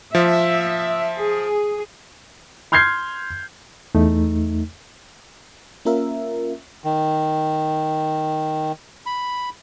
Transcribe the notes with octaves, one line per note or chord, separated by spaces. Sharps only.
F3 E5
G#4
C6 F6 G6 G#6 C7
E2 A3 D#4
A#3 C#4 F4 A#4 E5
D#3
B5